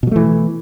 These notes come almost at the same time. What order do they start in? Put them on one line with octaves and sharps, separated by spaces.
B2 F#3 A3 E3